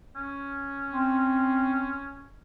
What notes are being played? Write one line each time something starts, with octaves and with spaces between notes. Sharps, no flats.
C#4
C4